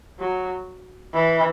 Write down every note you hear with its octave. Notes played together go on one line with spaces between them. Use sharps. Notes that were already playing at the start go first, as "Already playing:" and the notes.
F#3
E3